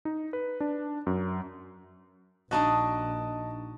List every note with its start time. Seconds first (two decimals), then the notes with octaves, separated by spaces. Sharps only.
0.05 D#4
0.33 B4
0.60 D4
1.07 F#2
2.51 A#1 D4 D#4 F#4 D#5 A5